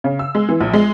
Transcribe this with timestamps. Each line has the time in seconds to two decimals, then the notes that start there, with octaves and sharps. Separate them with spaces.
0.04 C#3
0.19 E6
0.35 G#3
0.49 E3
0.61 A#1
0.74 G#3